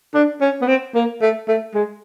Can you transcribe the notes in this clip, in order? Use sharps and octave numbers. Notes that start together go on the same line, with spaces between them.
D4
C#4
B3
C4
A#3
A3
A3
G#3